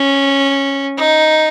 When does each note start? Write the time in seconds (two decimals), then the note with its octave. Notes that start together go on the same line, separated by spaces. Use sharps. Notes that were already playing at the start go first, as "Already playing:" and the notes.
Already playing: C#4
0.98 D#4